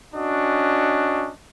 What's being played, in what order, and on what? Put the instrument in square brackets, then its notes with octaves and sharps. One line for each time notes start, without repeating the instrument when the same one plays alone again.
[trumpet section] C#4 D4 F#4 D#5